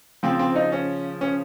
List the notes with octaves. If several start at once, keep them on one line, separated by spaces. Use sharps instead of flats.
C#3 F3 C4
C4
D#4
C#4
C#4